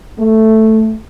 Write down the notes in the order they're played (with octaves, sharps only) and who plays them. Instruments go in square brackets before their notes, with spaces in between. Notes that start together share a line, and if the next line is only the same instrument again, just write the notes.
[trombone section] A3